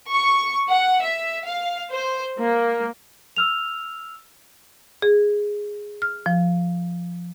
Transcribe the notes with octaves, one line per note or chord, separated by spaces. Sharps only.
C#6
F#5
E5
F5
C5
A#3
E6 F6 F7
G#4
F6
F3